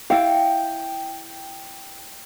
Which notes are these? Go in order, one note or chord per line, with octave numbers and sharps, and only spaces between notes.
E4 F5 G5